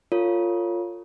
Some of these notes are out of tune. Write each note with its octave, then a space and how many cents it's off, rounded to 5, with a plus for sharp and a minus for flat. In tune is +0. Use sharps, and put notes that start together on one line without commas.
F4 +0 A#4 -45 C#5 +0